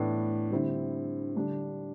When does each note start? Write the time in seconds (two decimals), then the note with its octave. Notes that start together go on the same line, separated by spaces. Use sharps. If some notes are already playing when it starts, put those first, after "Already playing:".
Already playing: A2 E3 B3 D4
0.51 D3 G3 C4 E4
1.36 D3 G3 D4